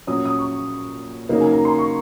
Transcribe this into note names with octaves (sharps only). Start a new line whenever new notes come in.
A#2 F#3 C#4 D#6
D#6
C#6
C#3 F#3 A#3 D#4
G#5
A#5
C6
C#6